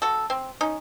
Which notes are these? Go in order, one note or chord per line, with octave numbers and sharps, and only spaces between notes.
F#4 A4
C4
C#4 D#4